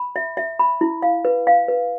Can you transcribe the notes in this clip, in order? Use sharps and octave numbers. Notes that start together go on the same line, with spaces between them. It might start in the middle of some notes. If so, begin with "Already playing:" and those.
Already playing: B5
E5
E5
B5
E4
F5
B4
F5
B4